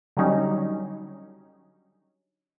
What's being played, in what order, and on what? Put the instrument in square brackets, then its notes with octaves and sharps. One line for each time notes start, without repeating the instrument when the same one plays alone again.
[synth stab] D3 F#3 G3 C#4 D#4